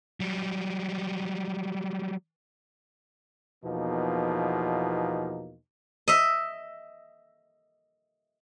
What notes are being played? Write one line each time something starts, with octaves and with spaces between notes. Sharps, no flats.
F#3 G3
E2 B2 F3 A#3 D#4
D#5 E5